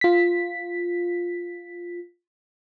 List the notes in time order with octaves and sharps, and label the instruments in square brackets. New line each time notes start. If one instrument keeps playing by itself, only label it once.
[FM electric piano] F4 B6